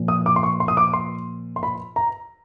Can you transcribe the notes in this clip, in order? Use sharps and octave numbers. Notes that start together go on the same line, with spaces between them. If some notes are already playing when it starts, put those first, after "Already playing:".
Already playing: A#2 F3
D#6
D6
C6
C#6
C6
D#6
D6
C6
C6
B5
A#5